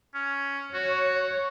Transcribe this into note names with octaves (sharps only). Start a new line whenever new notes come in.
C#4
F#4 C#5